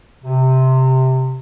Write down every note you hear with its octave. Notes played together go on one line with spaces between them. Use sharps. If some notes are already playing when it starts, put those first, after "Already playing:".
C3